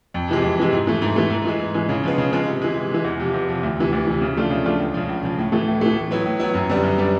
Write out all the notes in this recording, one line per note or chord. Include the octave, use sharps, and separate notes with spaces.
F2
C3 E3 G#3
F2
C3 E3 G#3
G#2
E3 A3
G#2
E3 A3
G#2
E3 G#3
G#2
E3 G#3
C#3
F3 G#3 B3
C#3
F3 G#3 B3
C3
E3 G#3
C3
E3 G#3
E2
C3 F3
E2
C3 F3
D2
C3 E3
D2
C3 E3
C#3
F3 A3 D4 F4
C#3
F3 A3 D4 F4
C#2
C#3 F3
C#2
C#3 F3
A2
E3 A3
A2
E3 A3
A2
F#3 B3 E4
A2
F#3 B3 E4
F#2
D3 G3 B3 D4
F#2
D3 G3 B3 D4